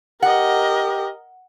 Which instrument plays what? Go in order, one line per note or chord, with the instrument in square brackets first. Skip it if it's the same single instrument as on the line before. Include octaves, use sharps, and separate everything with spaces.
[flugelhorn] G4 [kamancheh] A#4 D#5 [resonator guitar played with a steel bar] F#5